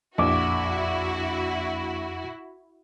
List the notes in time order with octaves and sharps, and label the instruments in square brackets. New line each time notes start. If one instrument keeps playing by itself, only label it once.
[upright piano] A#1 [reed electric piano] F2 D6 [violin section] E4 F#4